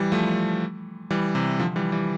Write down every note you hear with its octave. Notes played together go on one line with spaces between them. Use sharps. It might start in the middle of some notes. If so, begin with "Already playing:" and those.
Already playing: E3 G3
F3 A3
E3 G3
C3 E3
D3 F3
E3 G3
E3 G3